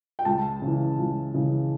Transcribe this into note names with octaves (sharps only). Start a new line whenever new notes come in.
G5
C#2 A5
C#3 E3
C#2
C#3 E3